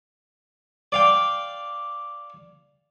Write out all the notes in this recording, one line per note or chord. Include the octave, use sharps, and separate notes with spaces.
D5 F5 G5